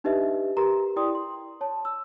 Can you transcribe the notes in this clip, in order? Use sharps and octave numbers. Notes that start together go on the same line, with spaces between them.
D4 D#4 G4 B4 D#5 E5
G4 A#4 B4 A#5 C6
E4 D5 G5 C6 D#6
C6
C#5 A5
E6